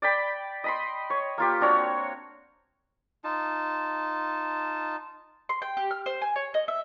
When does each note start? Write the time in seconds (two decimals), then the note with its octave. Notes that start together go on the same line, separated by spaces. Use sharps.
0.02 D5 G5 B5
0.64 D#5 B5 C6
1.10 C#5
1.38 A#3 F4 G4
1.61 C4 D4 F#4 C#5
3.24 D#4 F4 A5
5.49 C6
5.62 G5
5.77 G4
5.91 F6
6.06 C5
6.22 G#5
6.36 C#5
6.54 D#5
6.68 E5